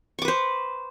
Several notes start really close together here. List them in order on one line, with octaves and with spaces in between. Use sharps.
C#6 D6 B4 C5